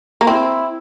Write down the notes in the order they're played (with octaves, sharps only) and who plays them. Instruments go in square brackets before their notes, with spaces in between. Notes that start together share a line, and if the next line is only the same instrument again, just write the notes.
[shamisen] A#3
[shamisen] C4 [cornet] E4